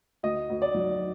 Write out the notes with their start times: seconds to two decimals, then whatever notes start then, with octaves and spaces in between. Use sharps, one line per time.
0.23 D2 D#5
0.50 D2
0.62 D5
0.75 F#3